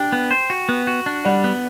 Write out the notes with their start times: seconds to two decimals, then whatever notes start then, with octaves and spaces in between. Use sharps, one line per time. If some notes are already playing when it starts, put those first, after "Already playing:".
Already playing: D4 G5
0.12 B3
0.31 C5
0.50 F#4
0.69 B3
0.87 F#4
1.06 D4
1.25 G3 D5 F#5
1.44 B3